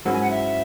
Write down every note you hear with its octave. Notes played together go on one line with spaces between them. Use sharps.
G#2 F#3 C#4 E4
G#5
F#5
E5